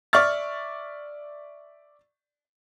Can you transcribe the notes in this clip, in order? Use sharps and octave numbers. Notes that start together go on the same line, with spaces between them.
D5 E5 C#6 F6 A6